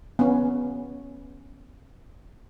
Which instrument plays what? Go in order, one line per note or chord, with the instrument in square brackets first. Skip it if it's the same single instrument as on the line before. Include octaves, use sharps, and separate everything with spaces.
[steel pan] B3 C#4